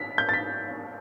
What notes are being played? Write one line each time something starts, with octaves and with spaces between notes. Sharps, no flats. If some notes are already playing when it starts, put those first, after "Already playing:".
Already playing: B6
G6
A6
B6